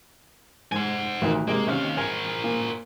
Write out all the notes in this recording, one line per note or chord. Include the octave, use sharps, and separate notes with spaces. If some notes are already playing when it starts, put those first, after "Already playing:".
G#2 C5 G#5
A1 D2 D#3
C3 G#3 A#3
D#2 C3 C#4 F5
A#4 C5 G#5
A#2